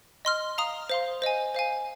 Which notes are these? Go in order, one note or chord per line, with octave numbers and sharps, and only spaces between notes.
D#5 C6 F6
F5 A#5 D#6
C5 F5 C6
C5 D#5 G#5
C5 F5 G#5